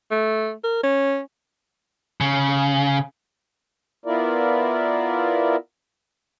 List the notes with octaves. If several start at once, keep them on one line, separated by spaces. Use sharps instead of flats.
A3
A#4
C#4
C#3
B3 E4 F4 A#4 D5